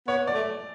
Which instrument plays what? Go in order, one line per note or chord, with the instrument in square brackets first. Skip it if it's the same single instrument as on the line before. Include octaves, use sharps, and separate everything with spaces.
[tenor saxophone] B3 [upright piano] C#5
[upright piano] D5
[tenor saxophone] A3